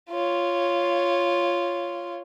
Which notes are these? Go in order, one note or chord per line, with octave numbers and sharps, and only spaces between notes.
F4 C#5